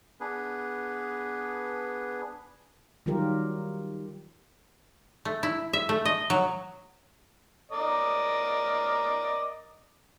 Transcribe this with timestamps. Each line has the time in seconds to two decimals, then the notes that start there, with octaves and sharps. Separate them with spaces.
0.20 B3 D4 G#4 B4
3.06 D#3 F#3 G3 F4 G4 A#4
5.25 A3
5.43 E4
5.73 E5
5.89 A3
6.05 D#5
6.30 F#3
7.72 A#4 D5 D#5